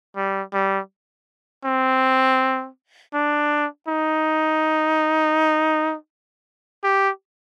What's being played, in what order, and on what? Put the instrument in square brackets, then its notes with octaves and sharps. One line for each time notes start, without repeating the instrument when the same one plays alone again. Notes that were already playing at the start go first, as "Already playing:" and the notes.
[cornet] G3
G3
C4
D4
D#4
G4